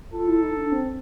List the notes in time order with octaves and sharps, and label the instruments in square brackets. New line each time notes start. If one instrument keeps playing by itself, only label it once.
[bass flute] F4 [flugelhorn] A4
[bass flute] E4
D#4
D4
C4